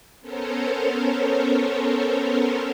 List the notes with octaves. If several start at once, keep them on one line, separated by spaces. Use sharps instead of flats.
B3 C#4 A4 A#4 C5 C#5